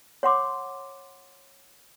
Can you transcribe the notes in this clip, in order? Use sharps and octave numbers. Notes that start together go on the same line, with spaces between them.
C#5 F#5 C6 D6